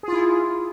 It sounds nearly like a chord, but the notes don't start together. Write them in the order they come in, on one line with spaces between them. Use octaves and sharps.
G#4 F4 E4